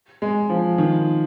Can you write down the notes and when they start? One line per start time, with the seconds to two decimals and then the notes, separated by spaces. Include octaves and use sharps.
0.22 G#3
0.50 F3
0.78 D#3